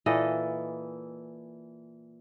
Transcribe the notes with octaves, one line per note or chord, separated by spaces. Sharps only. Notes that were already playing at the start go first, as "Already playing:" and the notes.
A#2 E3 A4 D#5